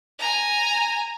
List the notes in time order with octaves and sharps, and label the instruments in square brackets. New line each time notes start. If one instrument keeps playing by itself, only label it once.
[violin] G#5 A#5